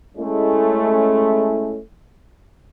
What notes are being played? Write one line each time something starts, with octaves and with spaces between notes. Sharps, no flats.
G#3 A3 C#4 E4